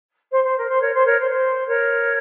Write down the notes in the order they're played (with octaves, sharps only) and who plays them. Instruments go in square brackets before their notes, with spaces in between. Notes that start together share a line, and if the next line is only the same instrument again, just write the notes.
[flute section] C5
C5
A#4
C5
A#4 C#5
C5
A#4 C#5
C5
C5
A#4 C#5